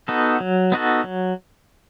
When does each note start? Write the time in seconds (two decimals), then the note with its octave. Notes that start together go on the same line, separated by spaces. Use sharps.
0.08 B3 D#4 F#4 A4
0.40 F#3
0.72 B3 D#4 F#4 A4
1.04 F#3